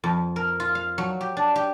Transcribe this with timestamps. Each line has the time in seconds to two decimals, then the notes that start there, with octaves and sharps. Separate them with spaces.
0.04 F2
0.36 A#4
0.60 F4
0.75 F5
0.98 F#3
1.21 G4
1.37 D4
1.56 G4